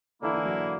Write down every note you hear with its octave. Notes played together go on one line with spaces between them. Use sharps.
D3 E3 A#3 E4
E3
F#3